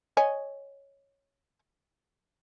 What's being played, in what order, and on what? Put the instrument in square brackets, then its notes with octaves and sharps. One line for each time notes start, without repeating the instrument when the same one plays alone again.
[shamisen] C#5 D#5 G#5